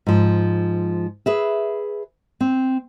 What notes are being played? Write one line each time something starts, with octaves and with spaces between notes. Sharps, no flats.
G#2 F3
G#4 B4 E5
C4